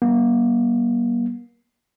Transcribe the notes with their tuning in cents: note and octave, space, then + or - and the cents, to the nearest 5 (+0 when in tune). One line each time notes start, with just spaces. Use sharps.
G3 -40 A#3 +40